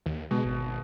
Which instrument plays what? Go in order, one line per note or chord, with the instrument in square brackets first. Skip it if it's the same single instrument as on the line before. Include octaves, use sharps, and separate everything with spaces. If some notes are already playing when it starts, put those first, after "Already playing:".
[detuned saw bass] D#2
[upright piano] B2 [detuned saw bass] G#3
[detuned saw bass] G#1